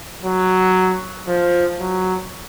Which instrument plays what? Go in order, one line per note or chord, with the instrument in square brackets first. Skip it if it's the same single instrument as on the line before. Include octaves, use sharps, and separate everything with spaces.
[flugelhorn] F#3
F3
F#3